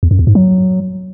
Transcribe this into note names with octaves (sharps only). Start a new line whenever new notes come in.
E2
F#2
E2
G#2
F#3